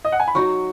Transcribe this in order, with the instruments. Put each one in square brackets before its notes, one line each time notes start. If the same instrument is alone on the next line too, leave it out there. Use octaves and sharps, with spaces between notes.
[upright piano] D#5
F#5
G#5
B5
[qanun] F#3 D#4 F#4 [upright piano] C#6